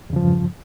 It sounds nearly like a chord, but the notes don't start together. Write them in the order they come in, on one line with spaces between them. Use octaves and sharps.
E2 C#3 F3 G2